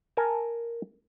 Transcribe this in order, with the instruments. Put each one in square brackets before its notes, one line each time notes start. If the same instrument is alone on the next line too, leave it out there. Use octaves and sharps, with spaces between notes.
[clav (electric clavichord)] A#4 G#5 A5